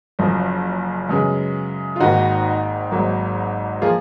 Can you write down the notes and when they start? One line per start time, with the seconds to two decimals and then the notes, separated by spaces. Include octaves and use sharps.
0.19 F#1 F#2 F3
1.09 F#2 C#3 G#3 B3
1.96 F4
2.00 G#1 G#2 D#3 A#3 D#4 F#4
2.91 G#1 G#2 F#3 A#3
3.82 F3 A#3 F4 G#4